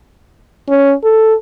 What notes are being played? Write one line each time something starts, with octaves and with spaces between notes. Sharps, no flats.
C#4
A4